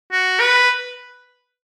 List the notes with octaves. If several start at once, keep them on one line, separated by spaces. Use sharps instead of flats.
F#4
B4